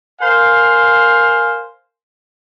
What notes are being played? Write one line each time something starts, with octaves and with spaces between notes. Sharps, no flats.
A#4 C5 F5 G#5